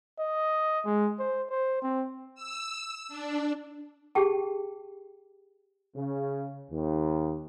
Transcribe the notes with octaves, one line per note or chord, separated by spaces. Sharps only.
D#5
G#3
C5
C5
C4
E6
D4
G4 G#4 G5 A5
C#3
D#2